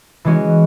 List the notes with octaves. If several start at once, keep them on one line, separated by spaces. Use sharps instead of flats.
E3 G#3 C#4 F#4